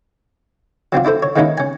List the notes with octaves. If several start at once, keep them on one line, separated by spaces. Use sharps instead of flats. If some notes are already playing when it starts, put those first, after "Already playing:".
F#3 C4 D4 F4
D4 E4 A4 C5
C#5
D#3 G#3 A#3 C#4 D#4 E4
C#4 G#5